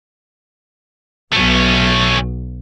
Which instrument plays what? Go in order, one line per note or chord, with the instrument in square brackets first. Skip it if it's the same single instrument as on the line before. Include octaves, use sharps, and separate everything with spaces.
[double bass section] B1 [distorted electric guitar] A3 C#4